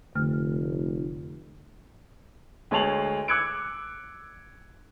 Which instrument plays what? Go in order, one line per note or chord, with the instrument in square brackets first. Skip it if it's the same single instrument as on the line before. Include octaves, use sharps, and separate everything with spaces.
[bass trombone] F1 [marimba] D3 A3 F6
[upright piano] D2 G#3 C#5 A5 F7 F#7
D6 E6 F#6 G#6 C#7 D7